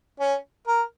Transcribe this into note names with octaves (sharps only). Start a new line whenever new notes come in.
C#4
A#4